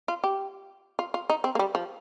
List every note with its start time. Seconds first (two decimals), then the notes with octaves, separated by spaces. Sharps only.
0.08 F4
0.24 G4
0.99 F4
1.14 F4
1.30 D#4
1.44 C4
1.55 A#3
1.59 G3
1.75 F3